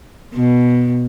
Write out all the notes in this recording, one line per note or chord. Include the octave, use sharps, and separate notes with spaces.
B2